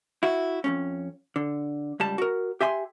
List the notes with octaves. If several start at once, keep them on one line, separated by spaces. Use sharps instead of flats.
E4 F#4
F2 G#2 C#4
D3
C#2 G3 A5
F#4 A#4
G4 E5 G#5 C6